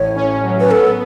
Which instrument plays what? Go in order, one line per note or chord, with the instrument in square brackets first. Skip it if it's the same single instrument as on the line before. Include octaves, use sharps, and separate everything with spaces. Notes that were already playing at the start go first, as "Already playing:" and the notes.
Already playing: [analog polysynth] A1 A2 [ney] C#5
[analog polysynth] C#4
F#3
[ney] B4
[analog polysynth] B3 [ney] A4